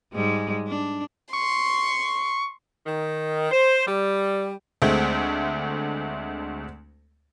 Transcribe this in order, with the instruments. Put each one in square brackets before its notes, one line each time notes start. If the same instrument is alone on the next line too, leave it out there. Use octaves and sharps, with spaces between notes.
[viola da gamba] G#2 G3 G#3
D4
[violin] C6 [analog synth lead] C#6
[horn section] D#3
C5
G3
[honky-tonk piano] D2 G#3 A3 C4